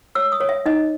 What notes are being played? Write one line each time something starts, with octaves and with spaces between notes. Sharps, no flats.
C#5 E6
D#6
C#5
E5
D#4 D#5